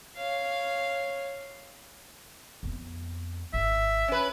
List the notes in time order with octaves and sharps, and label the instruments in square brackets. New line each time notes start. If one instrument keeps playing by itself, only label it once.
[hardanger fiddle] C#5 F5
[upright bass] F2 B3
[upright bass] G#1 [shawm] E5
[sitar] C#4 B4